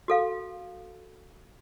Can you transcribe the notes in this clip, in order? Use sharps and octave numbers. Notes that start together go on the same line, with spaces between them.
F#4 A4 F5